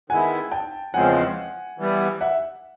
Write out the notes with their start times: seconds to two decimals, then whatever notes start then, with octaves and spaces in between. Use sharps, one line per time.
0.10 D#3 G#3 B3 E4 F#5 G#5
0.52 G5 A5
0.94 E2 C#3 F3 G#3 C4 F#5 G#5
1.78 E3 G3 B3
2.21 E5 F#5